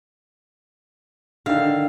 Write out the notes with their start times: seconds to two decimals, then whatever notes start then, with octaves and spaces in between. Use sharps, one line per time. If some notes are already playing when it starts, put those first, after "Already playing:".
1.46 D3 D#3 F5